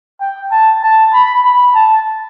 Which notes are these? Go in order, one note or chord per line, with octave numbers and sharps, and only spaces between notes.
G5
A5
A5
B5
B5
A5